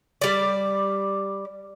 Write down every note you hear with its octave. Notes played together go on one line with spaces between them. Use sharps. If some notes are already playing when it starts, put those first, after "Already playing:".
G3 D5